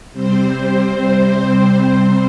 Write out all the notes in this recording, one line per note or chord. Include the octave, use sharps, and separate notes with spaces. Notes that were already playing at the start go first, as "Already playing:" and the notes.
C3 G3 C4 C5
C5